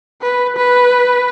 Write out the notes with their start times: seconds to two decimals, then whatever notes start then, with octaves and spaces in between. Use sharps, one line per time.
0.22 B4
0.56 B4